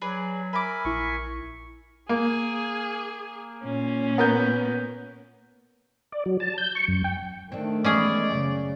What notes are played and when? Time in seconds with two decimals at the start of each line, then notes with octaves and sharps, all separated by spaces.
0.02 F#3 G#4 B4 D5
0.53 A#4 E5 G#5 B5 D6
0.85 A#1 E4 C#6
2.09 A#3 G#4
3.63 A#2 C#4
4.18 B3 A#4 G6
6.12 D5
6.26 F#3
6.40 A5
6.58 G6
6.75 C#6
6.88 F#2
7.04 G5
7.52 D#3 A3 C4 D4
7.84 E3 G#3 B3 C#4 G#4 D5
8.31 F#2 C#3